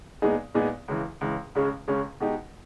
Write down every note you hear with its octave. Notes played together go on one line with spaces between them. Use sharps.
A#2 G#3 B3 D#4 G#4
A#2 G#3 B3 D#4 G#4
C#2 C#3 E3
C#2 C#3 E3
C#2 C#3 G#3 C#4
C#2 C#3 G#3 C#4
B2 G#3 D#4 G4